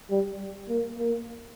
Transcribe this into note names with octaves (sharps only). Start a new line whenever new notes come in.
G3
A#3
A#3